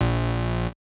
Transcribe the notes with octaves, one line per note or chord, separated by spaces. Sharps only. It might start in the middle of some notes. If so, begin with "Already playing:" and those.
A#1